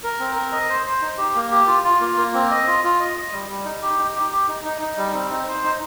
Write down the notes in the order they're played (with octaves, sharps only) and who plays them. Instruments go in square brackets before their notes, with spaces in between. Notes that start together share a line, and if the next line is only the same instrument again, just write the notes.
[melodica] A#4
C4
A#4
D#5
C5
C5
D#4
G4
A#3
G4
F4
F4
A#3
A#3
C4
D#5
F4
F4
D#5
D#5
G3
G3
D#4
G4
D#4
G4
G4
D#4
D#4
D#4
G3
C4
D#4
C5
D#4